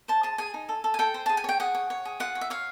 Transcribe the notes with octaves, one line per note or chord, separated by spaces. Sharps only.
C5 A5
G#4 A5
G#4 G#5
D#4
A4
A4
G#5
A4 G5
C5
G#4 A5
G#5
C#5 G5
G#4 F#5
C#5
C#5
G#4
F4 F#5
C#5
E5
C#5 F5